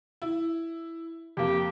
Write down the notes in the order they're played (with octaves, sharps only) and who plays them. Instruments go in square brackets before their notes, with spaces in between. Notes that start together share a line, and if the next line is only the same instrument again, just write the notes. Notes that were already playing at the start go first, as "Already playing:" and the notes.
[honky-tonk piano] E4
[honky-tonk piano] F2 A#3 [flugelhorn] G4